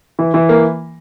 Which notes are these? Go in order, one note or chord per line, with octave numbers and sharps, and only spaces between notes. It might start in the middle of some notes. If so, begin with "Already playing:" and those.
E3
E3
A#3